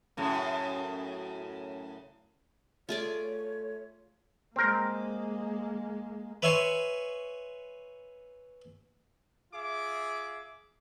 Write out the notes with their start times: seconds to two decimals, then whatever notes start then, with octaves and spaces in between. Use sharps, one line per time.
0.17 F#2 A2 C#3
2.89 A3 F4 G#4 C#5 D5
4.56 G#3 A#3 C4 A#4
6.42 B4 C#5 E5 G#5 C6 C#6
9.53 F4 G#4 E5 D6